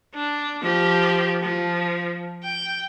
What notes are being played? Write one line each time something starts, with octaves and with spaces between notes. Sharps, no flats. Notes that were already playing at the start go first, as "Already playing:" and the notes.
D4
F3 G4
F3
G5